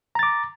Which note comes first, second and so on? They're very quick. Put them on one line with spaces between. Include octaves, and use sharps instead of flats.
A#5 A6 D6